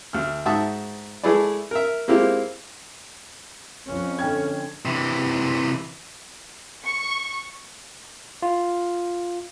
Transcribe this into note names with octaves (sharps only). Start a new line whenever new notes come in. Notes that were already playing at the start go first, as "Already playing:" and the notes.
D2 F6
G#2 F#4 E5 A5 D#6
G#3 A3 E4 G#4 B4 D5
A#4 E5
G#3 A#3 C4 E4 F4 G4
F2 C#4
D3 G5 G#6
C3 E3
C#6
F4